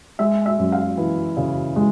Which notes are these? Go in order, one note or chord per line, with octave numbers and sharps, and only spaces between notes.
G#3 E5
E5
F#2
F5
E3
C#3
G#3